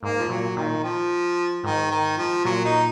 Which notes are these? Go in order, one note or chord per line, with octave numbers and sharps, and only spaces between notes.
G#2 A#3
F3
A#2 F#3
A#2 D#3
F3
G#2 D#3
D#3
F3
A#2 F#3
D#4